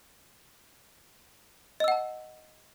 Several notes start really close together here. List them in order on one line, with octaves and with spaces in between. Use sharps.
D#5 E6 F#5 A5